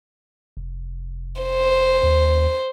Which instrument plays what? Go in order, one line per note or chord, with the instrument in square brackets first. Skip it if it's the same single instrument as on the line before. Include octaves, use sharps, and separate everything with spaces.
[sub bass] F1
[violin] C5
[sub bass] D#2